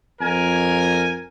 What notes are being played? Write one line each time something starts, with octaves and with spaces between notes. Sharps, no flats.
F2 A#4 G#5